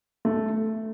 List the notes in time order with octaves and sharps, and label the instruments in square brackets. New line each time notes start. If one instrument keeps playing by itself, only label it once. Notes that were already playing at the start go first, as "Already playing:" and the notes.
[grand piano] A3